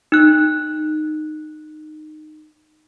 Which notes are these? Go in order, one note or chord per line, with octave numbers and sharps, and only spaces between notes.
D#4 F#6